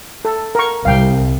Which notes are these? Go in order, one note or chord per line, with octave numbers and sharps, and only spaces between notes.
A4
A#4 C#6
C2 F5 G5